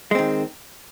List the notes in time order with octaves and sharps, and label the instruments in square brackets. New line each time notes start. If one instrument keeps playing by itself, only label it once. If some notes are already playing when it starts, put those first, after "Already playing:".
[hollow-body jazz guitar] G#3
C4
D#3